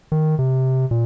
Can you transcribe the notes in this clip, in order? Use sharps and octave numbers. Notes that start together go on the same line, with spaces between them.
D#3
C3
A#2